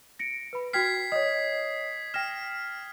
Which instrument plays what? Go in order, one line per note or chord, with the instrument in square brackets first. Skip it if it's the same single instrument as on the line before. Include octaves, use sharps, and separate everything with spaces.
[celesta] A#6 C#7 D7
B4 B5
[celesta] F#4 G5 F6 [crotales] G#6 B6 C7
[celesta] C#5 D#5 [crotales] D#6
[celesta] G5 A#6 E7 [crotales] F6